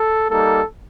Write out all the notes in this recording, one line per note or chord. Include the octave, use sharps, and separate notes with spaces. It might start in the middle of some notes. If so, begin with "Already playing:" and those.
Already playing: A4
G3 A#3 D#4 A4